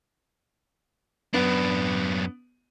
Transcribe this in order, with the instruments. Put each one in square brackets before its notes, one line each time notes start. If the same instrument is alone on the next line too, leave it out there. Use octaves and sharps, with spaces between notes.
[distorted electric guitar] F#2 D4 [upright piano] B3